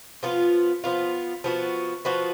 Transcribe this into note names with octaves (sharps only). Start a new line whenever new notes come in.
F3 B3 F4
F3 B3 F4
F3 B3 F#4
F3 B3 F#4